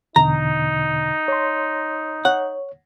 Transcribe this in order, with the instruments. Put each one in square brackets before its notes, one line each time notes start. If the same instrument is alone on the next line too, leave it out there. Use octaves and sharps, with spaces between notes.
[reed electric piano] E2 B2 D3 [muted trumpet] D#4 [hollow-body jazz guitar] A#5
[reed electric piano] C#5 C6
[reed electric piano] C#5 [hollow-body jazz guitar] F#5